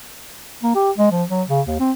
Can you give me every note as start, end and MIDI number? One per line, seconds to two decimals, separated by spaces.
0.63 0.74 58
0.75 0.91 67
0.98 1.09 56
1.12 1.24 53
1.29 1.43 54
1.48 1.61 49
1.67 1.77 39
1.80 1.92 60